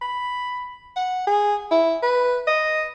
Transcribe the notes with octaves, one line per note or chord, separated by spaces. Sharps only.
B5
F#5
G#4
E4
B4
D#5